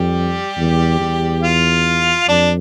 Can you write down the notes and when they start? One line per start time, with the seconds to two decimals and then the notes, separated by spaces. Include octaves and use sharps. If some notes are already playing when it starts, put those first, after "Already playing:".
Already playing: F2 G3 G4
0.57 E2
1.00 E2
1.43 F4 F5
2.28 F2 D4 D5